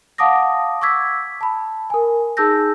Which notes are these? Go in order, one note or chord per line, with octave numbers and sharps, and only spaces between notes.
F5 F#5 A5 D6 D#6 A#6
C#6 D6 E6 G#6 B6
A5 B5
A#4 G#5
D#4 G#4 A5 E6 G6 A#6